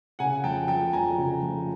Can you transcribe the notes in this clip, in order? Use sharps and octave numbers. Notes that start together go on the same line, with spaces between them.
C#3 F#5 G#5
F2 G5 A5
F3 G5 A5
F2 G#5 A#5
C#3
F2